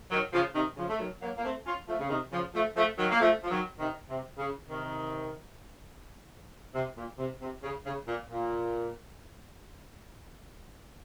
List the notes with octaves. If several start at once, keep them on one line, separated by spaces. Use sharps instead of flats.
D#3 F#3
C#3 F3
C3 D#3
C#3 F3
A3
D#3 F#3
F#3 A#3
A#3
A3 C4
C#4 F4
F3 A3
C#3
C3 D#3
C#3 F3
F3 A3
F3 A3
D#3 F#3
A#3
F3 A3
F3
D#3 F#3
C3 D#3
C3
C#3
C3 D#3
C3
A#2
C3
C3
C#3
C#3
A#2
A#2